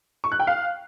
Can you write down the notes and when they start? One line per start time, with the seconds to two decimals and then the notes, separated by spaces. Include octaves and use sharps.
0.24 C#6
0.32 F#6
0.39 G5
0.47 F5